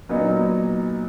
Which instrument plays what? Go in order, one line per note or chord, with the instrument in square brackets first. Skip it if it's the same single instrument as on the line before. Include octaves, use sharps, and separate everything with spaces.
[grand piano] A#2 F#3 B3 D#4